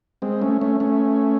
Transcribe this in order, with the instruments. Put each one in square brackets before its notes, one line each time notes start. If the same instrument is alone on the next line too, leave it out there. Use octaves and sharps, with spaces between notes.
[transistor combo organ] G#3 C4
A3 C#4
A3 C#4
A3 C#4